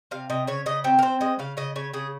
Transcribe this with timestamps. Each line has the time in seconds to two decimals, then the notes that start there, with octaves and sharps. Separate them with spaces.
0.11 C3 F5
0.30 C3 D#5
0.47 C#3 C#5
0.66 C#3 D#5
0.84 C4 G4
0.99 A#4
1.02 C4 C5
1.21 G#3 D#5
1.39 C#3 F5
1.57 C#3 D#5
1.76 C#3 C#5
1.94 C#3 G#4